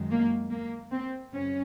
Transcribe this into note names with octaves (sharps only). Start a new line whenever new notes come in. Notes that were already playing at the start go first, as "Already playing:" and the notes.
Already playing: F#2 D#3 G#3
A#3
A#3
C4
F#2 C#3 C#4